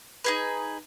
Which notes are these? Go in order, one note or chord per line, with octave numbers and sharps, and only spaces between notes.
D#4 G#4 B4